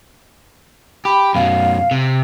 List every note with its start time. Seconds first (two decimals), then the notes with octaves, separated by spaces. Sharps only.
1.05 G4 B5
1.35 F#2 B2 F5
1.91 C3